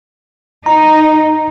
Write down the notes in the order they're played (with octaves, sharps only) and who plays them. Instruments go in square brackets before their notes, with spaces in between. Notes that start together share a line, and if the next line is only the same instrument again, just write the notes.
[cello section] D#4 [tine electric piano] A#5